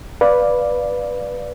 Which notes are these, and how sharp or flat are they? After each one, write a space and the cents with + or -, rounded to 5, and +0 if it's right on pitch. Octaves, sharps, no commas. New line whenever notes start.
B4 -10 D5 +0 F5 +0